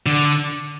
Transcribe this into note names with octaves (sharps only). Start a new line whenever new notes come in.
D3